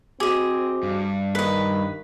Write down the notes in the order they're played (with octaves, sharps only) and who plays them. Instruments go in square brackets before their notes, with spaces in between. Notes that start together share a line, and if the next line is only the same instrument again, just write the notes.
[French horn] C4 [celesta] F#4 D6 [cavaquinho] G#4 D#5
[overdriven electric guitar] G2
[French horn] D#3 [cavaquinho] B4 D#5 [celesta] B6